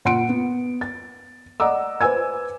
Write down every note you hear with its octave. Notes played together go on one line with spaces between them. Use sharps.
A#2 F#5 C6 C#7 D7
B3
A6
D5 D#5 F#5 A#5 D6 E6
B4 C5 G#5 E6 G#6